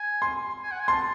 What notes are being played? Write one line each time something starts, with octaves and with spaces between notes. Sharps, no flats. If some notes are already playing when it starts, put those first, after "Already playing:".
Already playing: G#5
C6
G#5
F#5
G#5
A5 C6